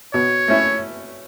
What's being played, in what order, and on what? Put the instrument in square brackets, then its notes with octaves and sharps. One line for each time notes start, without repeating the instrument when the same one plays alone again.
[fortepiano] B2 [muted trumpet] C#5
[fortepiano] A3 C#4 E4